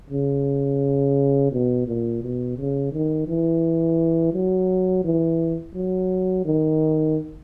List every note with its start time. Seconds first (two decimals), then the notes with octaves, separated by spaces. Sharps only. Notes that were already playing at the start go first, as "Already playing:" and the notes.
0.10 C#3
1.52 B2
1.87 A#2
2.22 B2
2.57 C#3
2.92 D#3
3.27 E3
4.33 F#3
5.04 E3
5.75 F#3
6.45 D#3